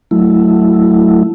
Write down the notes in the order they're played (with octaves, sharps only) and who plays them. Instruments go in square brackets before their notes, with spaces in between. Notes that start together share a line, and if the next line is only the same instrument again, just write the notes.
[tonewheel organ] F#3 A3 E4